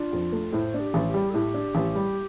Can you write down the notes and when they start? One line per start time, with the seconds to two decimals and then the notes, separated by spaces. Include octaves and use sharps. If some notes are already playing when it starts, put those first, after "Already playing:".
Already playing: D4 F4
0.13 F2
0.32 A3
0.53 A2 C5
0.74 D4
0.80 G4
0.94 A1
1.07 G4
1.14 G3
1.30 A4
1.34 A2 G4
1.54 D4
1.75 A1
1.95 G3